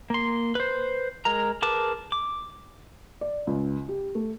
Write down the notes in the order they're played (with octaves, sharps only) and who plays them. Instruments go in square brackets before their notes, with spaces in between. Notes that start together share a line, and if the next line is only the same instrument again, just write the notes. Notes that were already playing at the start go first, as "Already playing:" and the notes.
[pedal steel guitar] A#3 C6
B4 C5
G#3 A#4 A#5
G#4 A#4 B4 A5 D6
D6
[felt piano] D5
C#2
G4
A3